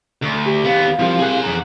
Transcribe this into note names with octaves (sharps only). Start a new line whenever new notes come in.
D2
G4
D#2 B3 F5
F3 C4 E4 G4
G#4 F#5
F2 E3 C#4 A#5